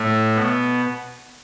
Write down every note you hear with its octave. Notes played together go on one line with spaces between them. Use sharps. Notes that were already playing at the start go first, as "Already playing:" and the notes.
Already playing: A2 A3
B2 B3